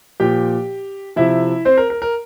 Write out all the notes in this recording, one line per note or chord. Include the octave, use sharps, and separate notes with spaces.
A#2 F3 G4 G5
C3 F3 E4 E5
C4 C5
A#4
A#4
A#4